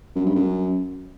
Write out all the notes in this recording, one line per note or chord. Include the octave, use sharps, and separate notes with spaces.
F#2
G2
F#2